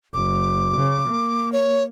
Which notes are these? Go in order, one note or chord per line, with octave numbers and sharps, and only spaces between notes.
F#1 D6
C#3
A#3
C#5